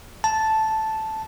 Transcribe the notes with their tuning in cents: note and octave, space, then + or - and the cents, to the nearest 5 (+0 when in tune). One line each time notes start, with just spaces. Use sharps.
A5 -5